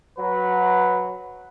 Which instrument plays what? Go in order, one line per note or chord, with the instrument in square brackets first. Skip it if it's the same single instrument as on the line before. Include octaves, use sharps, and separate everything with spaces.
[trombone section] F#3 [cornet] B4